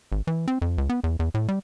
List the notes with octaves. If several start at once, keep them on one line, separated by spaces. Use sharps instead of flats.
G#1
E3
C4
F2
C#2
B3
E2
E2
A2
G3